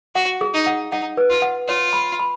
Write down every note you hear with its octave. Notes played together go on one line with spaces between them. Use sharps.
F#4 F#5
G#4
D#4
F#5
D#4 F#5
B4
F4
F#5
F4 C#5
B5
B5